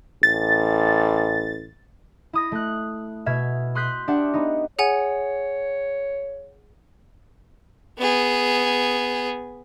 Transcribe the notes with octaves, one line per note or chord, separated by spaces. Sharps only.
A1 A6
E4 D#6 A#6
A3 F#6
B2 E5 F6 G#6
C6 D#6 F#6 G6 B6 C7
D4 G4 E5 F#5
B3 D#4
G#4 C#5 F#5 G#5
B3 G#4